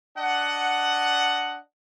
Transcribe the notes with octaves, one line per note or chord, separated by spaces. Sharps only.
D4 D#5 F#5